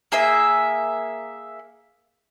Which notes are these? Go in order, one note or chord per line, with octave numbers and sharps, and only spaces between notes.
A#3 G#4 E5